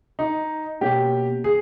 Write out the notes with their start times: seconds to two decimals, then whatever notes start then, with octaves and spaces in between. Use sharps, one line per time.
0.19 D#4
0.81 B2 A#3 C#4 G4
1.44 G#4